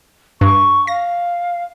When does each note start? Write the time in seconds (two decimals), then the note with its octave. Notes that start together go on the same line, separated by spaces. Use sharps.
0.41 G2 C#6
0.87 F5 A#6